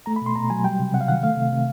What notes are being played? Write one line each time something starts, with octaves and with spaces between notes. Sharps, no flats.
A3 A#5
B5
B2
C6
B2 A#5
F#3 G#5
G3 G5
C3
C3 F#5
F5
D#3 F#5
A3 F5
C3
C3